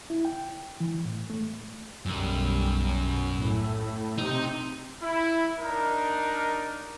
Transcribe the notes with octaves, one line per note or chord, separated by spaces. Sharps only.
E4
G5
E3
A2
A3
B1 F#2 G3
B2
A2
C3 D#4
E4
D4 D#4 A#4